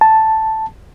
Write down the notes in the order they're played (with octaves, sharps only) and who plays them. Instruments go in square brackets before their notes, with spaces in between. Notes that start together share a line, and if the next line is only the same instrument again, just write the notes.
[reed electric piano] A5